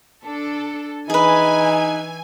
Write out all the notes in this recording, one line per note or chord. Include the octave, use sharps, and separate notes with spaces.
D4 A4
E3 D#4 G#4 B4 G#5